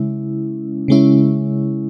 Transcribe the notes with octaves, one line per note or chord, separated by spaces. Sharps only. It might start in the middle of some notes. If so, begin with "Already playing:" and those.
Already playing: C#3 G#3 C#4 E4
C#3 G#3 C#4 E4